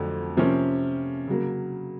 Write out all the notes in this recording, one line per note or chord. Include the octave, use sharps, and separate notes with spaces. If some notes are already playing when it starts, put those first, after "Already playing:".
Already playing: F2 D3 F#3 A3
C3 F3 A#3 C#4
C#3 F#3 A#3